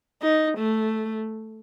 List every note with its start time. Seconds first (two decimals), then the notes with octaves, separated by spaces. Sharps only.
0.22 D#4
0.59 A3